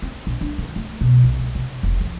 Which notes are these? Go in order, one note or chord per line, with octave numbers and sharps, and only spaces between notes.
C4
A#1
D4
D#3
A3
B2
B1
G3
C3
F1
F2